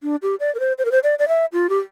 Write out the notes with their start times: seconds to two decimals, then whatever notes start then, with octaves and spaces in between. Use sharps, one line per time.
0.03 D4
0.22 G4
0.40 D5
0.55 A#4
0.60 C5
0.78 C5
0.85 A#4
0.92 C5
1.03 D5
1.19 D5
1.28 E5
1.53 F4
1.69 G4